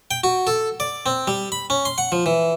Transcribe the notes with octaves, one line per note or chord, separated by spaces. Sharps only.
G5
F#4
A4
D5
C4
G3
B5
C#4
C6
F#5
F3
E3